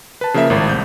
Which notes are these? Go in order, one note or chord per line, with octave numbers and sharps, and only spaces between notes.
B4 A5
C#3 F3 A#3 A#4 E5
G#1 A2
C2 G6